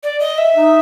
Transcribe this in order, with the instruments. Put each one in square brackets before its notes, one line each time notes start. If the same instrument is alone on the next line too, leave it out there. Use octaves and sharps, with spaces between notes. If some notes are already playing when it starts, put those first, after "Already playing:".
[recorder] D5
D#5
E5
[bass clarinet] D#4